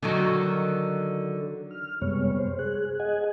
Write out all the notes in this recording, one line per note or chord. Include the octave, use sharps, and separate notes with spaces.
D3 D#3 F#3
F6
F#2 C3 G3 G#3 B3 C#5
C5
G#4 F#6
G#4 D#5 F#5 G#5